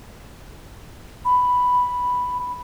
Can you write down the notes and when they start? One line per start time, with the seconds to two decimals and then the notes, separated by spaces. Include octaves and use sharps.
1.25 B5